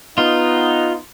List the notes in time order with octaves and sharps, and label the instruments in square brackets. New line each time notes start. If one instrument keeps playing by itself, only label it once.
[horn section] B3 D#4 [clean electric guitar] F4